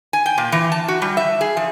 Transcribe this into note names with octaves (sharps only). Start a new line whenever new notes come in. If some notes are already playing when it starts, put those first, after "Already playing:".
G#5
G5
A#2
E3
A5
F#4
G3
E5
G#4
F3